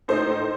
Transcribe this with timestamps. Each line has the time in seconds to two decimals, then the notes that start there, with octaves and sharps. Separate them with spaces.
0.08 A2 A3 D#4 C5